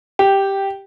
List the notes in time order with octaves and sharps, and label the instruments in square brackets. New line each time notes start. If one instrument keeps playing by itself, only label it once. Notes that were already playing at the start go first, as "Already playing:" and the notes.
[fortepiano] G4 [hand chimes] G5